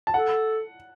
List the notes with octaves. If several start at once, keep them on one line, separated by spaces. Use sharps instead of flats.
A5
A4 F#5